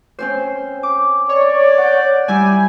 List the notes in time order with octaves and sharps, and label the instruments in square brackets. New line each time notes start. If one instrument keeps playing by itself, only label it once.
[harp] C4 C#4 C5
D6
[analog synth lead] C#5 [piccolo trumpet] D5
[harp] F#5 G6
[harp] G3 E4 [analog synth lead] G#5